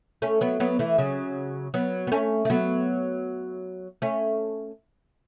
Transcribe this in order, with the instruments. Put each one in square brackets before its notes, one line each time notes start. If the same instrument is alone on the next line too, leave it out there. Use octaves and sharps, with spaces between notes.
[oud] A3 C#4
F#3 B3
F#3 B3
E3 A3
C#3 F#3
F#3 B3
B3
A3 C#4
A3
F#3 B3
A3 C#4